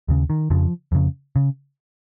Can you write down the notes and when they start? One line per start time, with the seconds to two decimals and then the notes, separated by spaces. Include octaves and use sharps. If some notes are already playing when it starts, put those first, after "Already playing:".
0.08 D#2 C#3
0.30 D#3
0.50 F2 C#3 F3
0.92 F2 C#3
1.36 C#3